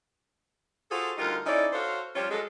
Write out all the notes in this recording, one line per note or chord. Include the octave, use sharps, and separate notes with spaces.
F4 F#4 G#4 A4 C5
D2 G3 D#4 F4 A#4
C#4 D#4 E4 A4 C#5 D5
F#4 A4 C5 C#5 F5
F3 G3 C#4 F4 C5 C#5
F#3 G#3 A4